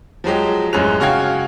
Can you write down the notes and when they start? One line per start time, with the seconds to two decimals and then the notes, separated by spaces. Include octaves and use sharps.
0.24 F3 F#3 G#3 G4
0.73 A1 F#2 G#3 C#5 F#6 F7
1.00 C#3 F#4 C#5 F5 G5 G#6